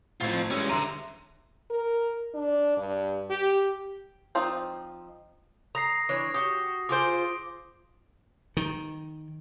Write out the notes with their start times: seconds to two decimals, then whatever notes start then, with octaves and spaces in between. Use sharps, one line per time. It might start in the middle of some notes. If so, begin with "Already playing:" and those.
0.21 G#1 A2 C4 F4 G#6
0.51 E3 G3 G#3 C#4 E6
0.70 D3 E5 A#5 C6 D#7
1.70 A#4
2.34 D4
2.77 G2
3.30 G4
4.35 F3 C4 D#4 D5
5.75 A#5 D#6 A#6 C7
6.09 E3 D4 C#5
6.34 F#4 G4 D#6
6.89 F4 G#4 C5 D6 D7
8.57 D#3